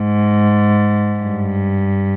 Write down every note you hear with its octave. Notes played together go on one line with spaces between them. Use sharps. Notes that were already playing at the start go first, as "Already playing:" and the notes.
Already playing: G#2
G2